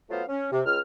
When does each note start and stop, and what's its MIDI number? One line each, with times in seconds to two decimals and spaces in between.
0.09 0.23 54
0.09 0.23 57
0.09 0.23 59
0.09 0.23 65
0.09 0.23 72
0.09 0.23 77
0.29 0.47 61
0.52 0.60 48
0.65 0.78 37
0.65 0.78 89